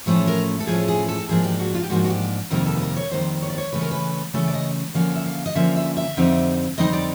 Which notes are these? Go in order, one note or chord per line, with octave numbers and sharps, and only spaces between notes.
A2 F3 A3 C#4 A4
A#4
A4
A2 F3 A3 C#4 G#4
G#4
A4
G#2 F3 A#3 D4 G#4
G4
F#4
F4
G4
G#2 F3 A#3 D4 F#4
F#4
G4
F2 C3 D#3 G3 A#3 A#4
A4
B4
A#4
C#5
F2 C3 D#3 G3 A#3 C5
C#5
D5
C#5
C#3 E3 A3 C#4 B4
A#4
B4
C#3 E3 A3 C#4 A4
D5
D#5
D3 F3 A#3 C#4 F5
E5
F5
D#5
D3 F3 A#3 C#4 E5
E5
E5
F2 D3 G3 C4 D#4
F2 D3 G3 C4 D#4 D#5
D5